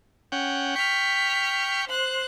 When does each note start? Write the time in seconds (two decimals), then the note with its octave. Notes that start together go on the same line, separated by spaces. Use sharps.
0.32 C#4 F#5 G5
0.76 G5 C#6 F6 B6
1.88 C5 F#6